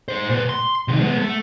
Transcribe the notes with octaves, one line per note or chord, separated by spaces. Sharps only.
G#4 C5
A#2 B4
C6
C3 D#3
G#3 B3
A3